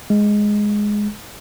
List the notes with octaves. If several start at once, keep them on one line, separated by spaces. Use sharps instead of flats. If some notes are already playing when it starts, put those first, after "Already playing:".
G#3